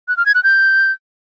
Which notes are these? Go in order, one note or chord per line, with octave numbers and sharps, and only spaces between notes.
F#6
F6
G#6
F#6
G6